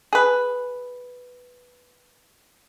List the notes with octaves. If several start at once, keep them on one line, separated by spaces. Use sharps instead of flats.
G#4 B4